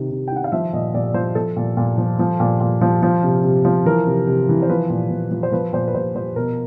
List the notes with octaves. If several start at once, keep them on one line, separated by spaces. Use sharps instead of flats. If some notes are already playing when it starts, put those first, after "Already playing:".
Already playing: C3 D#3
C3
G5
D#3 F#5
F5
F3 E5
A#2 D#5
A#2 D5
F3 C5
F3 A4
A#2
A#2
F3
F3
A#2
A#2
F3
F3
C3
C3
F3
E3 A#4
C3
C3
E3
C5
F3 B4
A#2
A#2
F3
C5
F3 B4
A#2 C5
B4
A#2 C5
F3 C5
B2 A#4